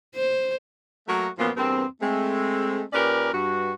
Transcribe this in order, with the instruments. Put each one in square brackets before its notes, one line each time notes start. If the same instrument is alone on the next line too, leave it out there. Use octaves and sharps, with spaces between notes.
[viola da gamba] C5
[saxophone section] F#3 A3 A#3 F#4 A#4
F#2 A#2 F3 A#3 B3 F4
E2 G2 A#3 C4
G#3 A3 C4
A#2 C#4 G4 A#4 B4 D5
G2 F#4